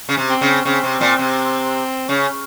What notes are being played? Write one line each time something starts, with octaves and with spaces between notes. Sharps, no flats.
C#3
C3
C4
C#3
C#3 C4
C3
A#2
C3
C#3 C#4